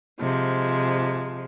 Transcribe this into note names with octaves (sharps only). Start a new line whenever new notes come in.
C3 F3 G#3